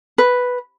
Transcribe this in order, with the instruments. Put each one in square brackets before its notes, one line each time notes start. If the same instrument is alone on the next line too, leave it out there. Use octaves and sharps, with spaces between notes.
[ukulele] B4